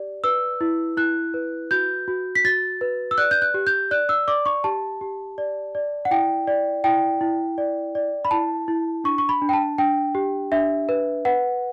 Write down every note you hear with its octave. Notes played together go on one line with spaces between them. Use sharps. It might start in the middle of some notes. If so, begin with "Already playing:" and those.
Already playing: G4 D5
B4 E6
E4
E4 F#6
B4
F#4 G6
F#4
B6
F#4 A6
B4
E6
D5 F#6
G6
F#6
G4
G6
D5 F#6
E6
D5 D6
C#6
G4 A5
G4
D5
D5
F#5
E4 G5
D5
E4 G5
E4
D5
D5
B5
E4 A5
E4
D4 C#6
C#6
B5
D4
G5
A5
D4 G5
G4
D4 E5
B4
B4 F#5